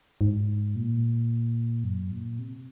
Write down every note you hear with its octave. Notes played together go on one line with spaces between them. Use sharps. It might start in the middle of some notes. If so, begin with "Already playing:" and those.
G#2
A#2
F#2
A#2
C3